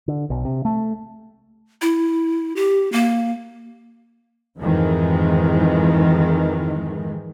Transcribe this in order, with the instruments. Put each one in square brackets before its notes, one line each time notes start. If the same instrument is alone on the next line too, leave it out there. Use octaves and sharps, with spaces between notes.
[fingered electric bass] D3
B1
C3
A3
[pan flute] E4
G4
A#3
[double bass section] F2 G#2 D#3 E3 G#3